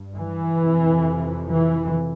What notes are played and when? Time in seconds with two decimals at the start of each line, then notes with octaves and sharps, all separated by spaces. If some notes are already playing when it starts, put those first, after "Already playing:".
Already playing: G2
0.17 E3
0.60 F2 C3
1.48 E3